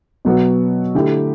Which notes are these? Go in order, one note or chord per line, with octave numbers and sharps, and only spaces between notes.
B2 F#3 B3 F#4
D3 A3 E4 G4